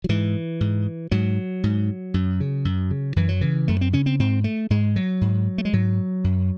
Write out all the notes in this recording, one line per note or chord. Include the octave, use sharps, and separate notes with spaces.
F#3
G#2 E3
G#2
G#2 F#3
G#2
F#2
C#3
F#2
C#3
F#2 E3
F#3
C#3 E3
F#2 A3
C4
C#3 C#4
C4
G#2 C4
A3
G#2 G#3
F#3
G#2
A3
G#3
G#2 F#3
F#2